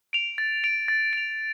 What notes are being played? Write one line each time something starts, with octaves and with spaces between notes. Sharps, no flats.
D7 F7
A6
D7 F7
A6
D7 F7